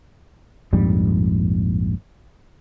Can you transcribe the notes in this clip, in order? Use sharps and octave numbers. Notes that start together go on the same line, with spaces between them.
A#1 F2 G#2 G3